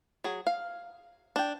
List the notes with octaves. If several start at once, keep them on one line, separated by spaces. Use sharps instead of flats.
F#3 G#4
F5
D4 G5